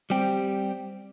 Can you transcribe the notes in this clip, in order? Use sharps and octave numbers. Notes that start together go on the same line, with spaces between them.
G3 C4 G4